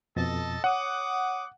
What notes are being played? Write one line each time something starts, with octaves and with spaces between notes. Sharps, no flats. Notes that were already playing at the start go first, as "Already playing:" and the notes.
F2 B2 A4 D#5 A5 A6
C#5 F#5 D6 D#6